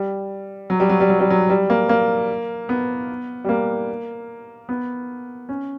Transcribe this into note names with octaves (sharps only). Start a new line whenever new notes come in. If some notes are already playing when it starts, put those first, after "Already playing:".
Already playing: G3
F#3
G3
F#3
G3
F#3
G3
F#3
G3
A#3
A#3
B3
G3
A#3
B3
C#4